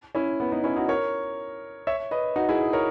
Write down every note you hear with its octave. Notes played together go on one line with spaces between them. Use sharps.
C#4 E4
B3
B3 D#4
C#4 E4
D#4 F#4
A#4 C#5
C#5 E5
B4 D#5
D#4 F#4
E4 G#4
A#4 C#5